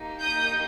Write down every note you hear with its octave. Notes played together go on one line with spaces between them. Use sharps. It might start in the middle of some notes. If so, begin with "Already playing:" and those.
Already playing: A#3 D#4 G4
D#6 G6